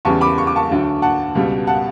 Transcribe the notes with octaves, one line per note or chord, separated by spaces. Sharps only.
E2 C#3 G3 A5 C#6
B5 D6
C#6
D6
A5 C#6
D2 D3 F#3
F#5 A5
C#2 B2 G3
F#5 A5